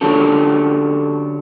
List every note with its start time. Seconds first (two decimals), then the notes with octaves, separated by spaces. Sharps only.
0.01 D3 F#3 C#4 D4 G4 A4